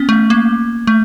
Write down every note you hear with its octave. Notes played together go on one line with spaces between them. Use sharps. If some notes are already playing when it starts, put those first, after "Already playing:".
Already playing: B3 C#4
A3
A#3
A3